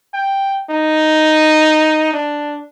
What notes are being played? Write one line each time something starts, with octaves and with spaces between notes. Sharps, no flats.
G5
D#4
D4